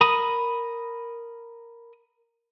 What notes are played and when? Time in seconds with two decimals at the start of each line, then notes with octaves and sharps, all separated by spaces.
0.01 A#4 B5 D#6